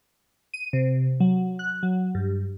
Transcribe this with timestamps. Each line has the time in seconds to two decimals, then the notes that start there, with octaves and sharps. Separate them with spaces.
0.54 D#7
0.73 C3
1.20 F#3
1.59 F#6
1.83 F#3
2.15 G2